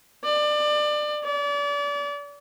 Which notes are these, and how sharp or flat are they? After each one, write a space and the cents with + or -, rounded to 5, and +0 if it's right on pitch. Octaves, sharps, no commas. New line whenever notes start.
D5 +25
D5 -35